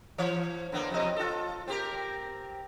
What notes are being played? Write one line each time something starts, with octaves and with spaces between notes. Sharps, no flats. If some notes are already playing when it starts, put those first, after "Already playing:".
E3 C#5
D3 A#3 B3
F2 C3 D#5
F4 A4
C4 G4 A#4